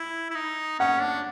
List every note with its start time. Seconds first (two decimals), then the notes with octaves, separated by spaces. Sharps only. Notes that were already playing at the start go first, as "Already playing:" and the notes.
Already playing: E4
0.31 E4
0.35 D#4
0.79 C#4 F#5
1.02 D4